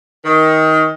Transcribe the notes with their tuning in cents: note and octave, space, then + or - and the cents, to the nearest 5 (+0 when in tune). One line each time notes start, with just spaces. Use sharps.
D#3 +20